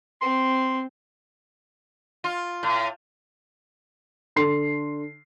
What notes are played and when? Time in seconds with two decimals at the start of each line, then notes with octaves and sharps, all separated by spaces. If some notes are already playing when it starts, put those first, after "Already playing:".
0.22 C4 C6
2.24 F4
2.63 A2
4.36 D3 A4 C6 C7